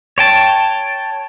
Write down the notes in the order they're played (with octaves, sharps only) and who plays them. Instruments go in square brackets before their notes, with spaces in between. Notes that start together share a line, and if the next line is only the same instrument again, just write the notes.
[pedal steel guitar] C#5 G5 A5